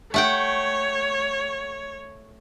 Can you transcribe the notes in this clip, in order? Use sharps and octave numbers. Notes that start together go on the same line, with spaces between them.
A3 C#5 F#5 G5